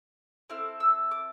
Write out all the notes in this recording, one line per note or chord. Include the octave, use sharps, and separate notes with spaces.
C4 E4 A4 F6
E6
D6